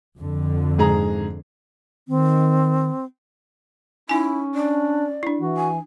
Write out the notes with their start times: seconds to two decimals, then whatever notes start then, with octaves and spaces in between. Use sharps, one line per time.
0.19 F2 D3
0.78 G#2 G#4 A#5
2.08 D#3 C4
4.09 C#4 D#4 E4 G#5
4.55 D4 D5
5.23 D4 E4
5.39 E3 F#4
5.57 G#5